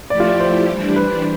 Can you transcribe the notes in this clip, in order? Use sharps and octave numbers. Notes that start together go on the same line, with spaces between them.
F3 A3 E4 G4 D5
F4
D5
C5
E3 G3 D4
B4